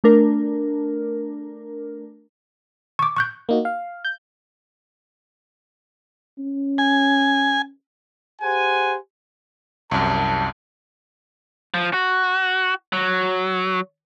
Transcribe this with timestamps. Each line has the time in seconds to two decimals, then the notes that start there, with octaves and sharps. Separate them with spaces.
0.04 A3 D4 A#4
2.99 C#6 D6
3.16 C#6 F#6 G6
3.49 A#3 D#4 F#4
3.65 F5
4.05 G6
6.39 C#4
6.78 G#5
8.42 G4 G#4 C5 F#5 G#5
9.91 C2 F#2 A5
11.74 F3
11.94 F#4
12.93 F#3